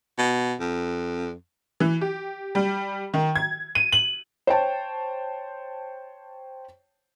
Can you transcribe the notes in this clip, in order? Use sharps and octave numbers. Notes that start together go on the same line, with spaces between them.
B2
F2
E3
G4
G3
D#3
G#6
D#7
F#7
C5 C#5 G5 A5